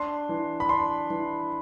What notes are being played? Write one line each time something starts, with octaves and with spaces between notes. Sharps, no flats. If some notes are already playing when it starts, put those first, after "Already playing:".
Already playing: D4 C6
E3
B5
D4 C6
E3